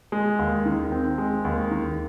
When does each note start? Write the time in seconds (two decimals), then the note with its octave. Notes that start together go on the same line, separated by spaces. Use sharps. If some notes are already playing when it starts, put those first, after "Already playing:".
0.12 G#3
0.39 D#2
0.65 D#3
0.92 C4
1.18 G#3
1.45 D#2
1.71 D#3